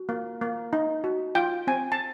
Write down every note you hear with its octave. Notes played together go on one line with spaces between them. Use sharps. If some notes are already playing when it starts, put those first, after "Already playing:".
Already playing: F#4
A#3
A#3
D#4
F#4
F4 G5
C4 G#5
A5